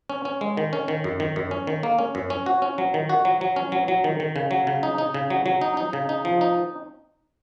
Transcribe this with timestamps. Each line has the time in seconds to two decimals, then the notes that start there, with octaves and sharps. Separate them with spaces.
0.10 C#4
0.25 C#4
0.41 G#3
0.57 D#3
0.73 C#4
0.88 D#3
1.04 F#2
1.20 D#3
1.36 F#2
1.51 C#4
1.67 D#3
1.83 A#3
1.99 C#4
2.15 F#2
2.30 C#4
2.46 F#4
2.62 C#4
2.78 F#3
2.94 D#3
3.09 F#4
3.25 F#3
3.41 F#3
3.56 C#4
3.72 F#3
3.88 F#3
4.04 D#3
4.20 D#3
4.36 C#3
4.51 F#3
4.67 C#3
4.83 D#4
4.98 D#4
5.14 C#3
5.30 F#3
5.46 F#3
5.61 D#4
5.77 D#4
5.93 C#3
6.09 D#4
6.25 F3
6.41 D#4